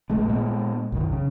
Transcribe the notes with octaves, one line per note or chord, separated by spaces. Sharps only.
A1 G#3 A3
A#2 G#3 B3
B1 F#2 D#3
C#3